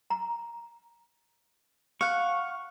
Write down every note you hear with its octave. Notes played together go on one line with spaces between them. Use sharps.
A#5
F5 F#5 C#6